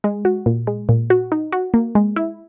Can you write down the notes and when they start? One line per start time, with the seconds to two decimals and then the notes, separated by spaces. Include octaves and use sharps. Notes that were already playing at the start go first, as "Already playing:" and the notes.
0.04 G#3
0.25 F#4
0.46 A#2
0.67 G#3
0.89 A#2
1.10 F#4
1.32 D#4
1.52 F#4
1.74 A#3
1.95 G#3
2.16 E4